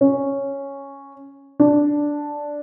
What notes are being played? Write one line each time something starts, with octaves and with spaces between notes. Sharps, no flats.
C#4
D4